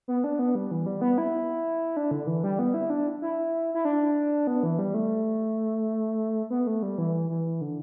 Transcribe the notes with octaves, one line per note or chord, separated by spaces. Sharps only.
B3
D4
B3
G3
E3
G3
B3
E4
D4
D3
E3
G3
B3
E4
D4
E4
E4
D4
B3
E3
G3
A3
B3
A3
G3
E3
E3
D3